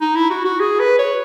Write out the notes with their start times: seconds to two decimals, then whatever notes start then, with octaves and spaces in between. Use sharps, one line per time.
0.01 D#4
0.16 E4
0.30 F#4
0.45 F#4
0.60 G#4
0.80 B4
0.99 C#5